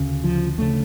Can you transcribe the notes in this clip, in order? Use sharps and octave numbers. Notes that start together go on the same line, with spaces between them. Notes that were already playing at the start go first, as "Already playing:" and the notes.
Already playing: D2 C#3
F3
D2 C#3 A3